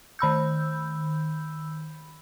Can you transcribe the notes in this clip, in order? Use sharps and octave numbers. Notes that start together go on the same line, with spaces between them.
D#3 B5 E6 G6